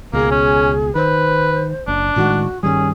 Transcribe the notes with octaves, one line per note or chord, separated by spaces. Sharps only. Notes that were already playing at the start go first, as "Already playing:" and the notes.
C#2 B2 A#3 G#4
C#4
D#3 B4 C5
F#1 D4
A2 D#3 G#3 F#4
G2 D#3 G3 C#4 G#4